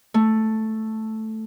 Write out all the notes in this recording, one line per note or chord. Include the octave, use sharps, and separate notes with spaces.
A3